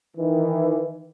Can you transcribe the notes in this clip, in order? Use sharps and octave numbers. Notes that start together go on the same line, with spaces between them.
D#3 E3